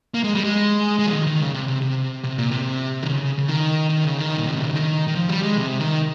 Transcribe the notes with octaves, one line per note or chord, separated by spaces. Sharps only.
A#3
G#3
G3
G#3
G#3
F3
D#3
D#3
C#3
C3
C3
C3
C3
A#2
C3
D#3
C#3
C#3
D#3
D#3
C#3
D#3
A#2
C3
C#3
D#3
D#3
F3
G3
G#3
C3
D#3